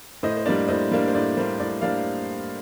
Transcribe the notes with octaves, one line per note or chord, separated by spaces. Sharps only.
A2 C5 D#5
C5
G3 A#3 D4 D5
A2 C5 D#5
G3 A#3 D4
C5
A2 D5
G3 A#3 D4 C5
A2 D5
G3 A#3 D4 D5 F5